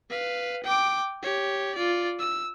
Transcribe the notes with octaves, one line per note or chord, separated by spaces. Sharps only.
B4 F5
G5 D6
G4 C#5
F4 D5
E6